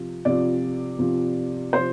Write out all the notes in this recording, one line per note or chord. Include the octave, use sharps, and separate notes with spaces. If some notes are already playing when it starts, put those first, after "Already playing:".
Already playing: C3 F3
C3 F3 D5
C3 F3
C3 F3 C5